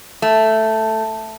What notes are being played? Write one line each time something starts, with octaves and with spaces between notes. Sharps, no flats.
A3